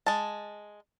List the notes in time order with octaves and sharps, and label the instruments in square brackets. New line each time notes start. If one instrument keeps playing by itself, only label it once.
[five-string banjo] G#3 A5